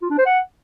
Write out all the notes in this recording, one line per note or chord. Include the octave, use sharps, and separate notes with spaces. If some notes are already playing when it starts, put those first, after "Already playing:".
F4
D4
C5
F#5